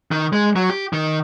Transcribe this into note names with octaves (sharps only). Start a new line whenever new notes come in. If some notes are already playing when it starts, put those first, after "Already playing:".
D#3
G#3
F#3
G4
D#3